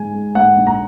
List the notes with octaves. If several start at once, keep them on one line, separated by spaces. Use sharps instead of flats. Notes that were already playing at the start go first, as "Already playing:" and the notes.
Already playing: G#2 G#3 G#5
G#3
G#2 F#5
A#1
A#5